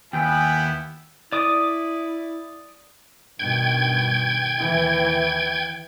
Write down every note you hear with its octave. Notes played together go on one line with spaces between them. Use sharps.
D#2 B3 E4 G4 G5 G#5
E4 D5 D6 D#6
G2 B2 D#3 G5 G#6
D#2 E3